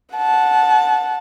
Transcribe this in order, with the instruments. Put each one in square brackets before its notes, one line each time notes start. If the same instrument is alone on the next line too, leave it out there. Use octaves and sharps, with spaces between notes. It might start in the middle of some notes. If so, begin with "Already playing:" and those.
[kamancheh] F#5 A5